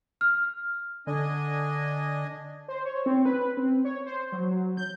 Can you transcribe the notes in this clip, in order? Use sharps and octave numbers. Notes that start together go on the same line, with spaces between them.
F6
D3 D4 D#5 G#5
C5
C#5
C4
B4
C4
C#5
C5
F#3
F#3
G6